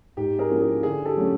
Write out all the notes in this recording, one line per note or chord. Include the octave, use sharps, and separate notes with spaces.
G#2 G4
G#4 A#4
F3 A#3 C#4 E4
G#4
D3 G#4
G4 A4
F#3 A3 C#4